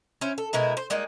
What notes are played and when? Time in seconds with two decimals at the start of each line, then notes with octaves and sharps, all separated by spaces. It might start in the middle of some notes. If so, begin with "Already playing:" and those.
0.21 C#4 E4 C5
0.38 A4
0.53 B2 G#3 E4 A#4
0.77 C5
0.90 G3 G#3 A#3 D#4